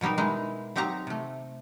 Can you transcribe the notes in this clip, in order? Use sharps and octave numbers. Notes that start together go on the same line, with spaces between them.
B2 F#3 G3 D#4 A#4
G#3 D#4 E4
F#3 C4 D#4 G4 F5 A#5
C3 A3